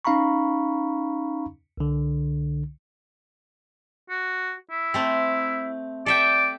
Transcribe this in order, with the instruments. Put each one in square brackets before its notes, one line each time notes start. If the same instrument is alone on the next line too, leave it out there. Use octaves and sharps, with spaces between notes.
[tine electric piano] C#4 D#4 F5 A#5 B5 C#6
C2 D3
[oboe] F#4
E4
[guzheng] A3 C4
[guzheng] A4 E5 G5 [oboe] D5